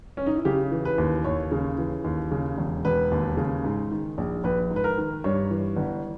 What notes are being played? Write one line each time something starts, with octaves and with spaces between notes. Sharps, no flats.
C#4
D#4
E4
C#3 G4
E3
B4
D#2
D#2 C#5
C#3
E3
D#2
C#3
E1
E1 B4
D#2
C#3
G#2
D#3
A#1
A#1 B4
G#2
B4
A#4
D#3
G2 C#5
E3
G1